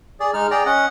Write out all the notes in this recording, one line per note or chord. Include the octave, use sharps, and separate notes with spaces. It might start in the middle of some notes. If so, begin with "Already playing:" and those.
G#4 D5
G#3 D#4 F6
G#4 D5 G5 A#5
C#4 D#5 F#5